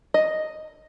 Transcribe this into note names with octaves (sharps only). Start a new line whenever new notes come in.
D#5